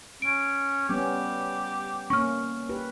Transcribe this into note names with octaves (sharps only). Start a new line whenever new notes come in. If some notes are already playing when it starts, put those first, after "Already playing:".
C#4 D7
G3 B3 C#4 G4
A#3 C#4 C#6 F6
G4 B4